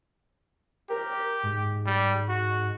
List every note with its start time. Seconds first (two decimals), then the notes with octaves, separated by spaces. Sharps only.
0.90 G4 A#4
1.43 G#2
1.86 G3
2.29 F#4